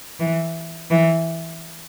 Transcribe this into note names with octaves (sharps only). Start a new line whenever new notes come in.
E3
E3